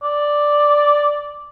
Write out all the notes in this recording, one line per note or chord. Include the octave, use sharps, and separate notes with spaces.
D5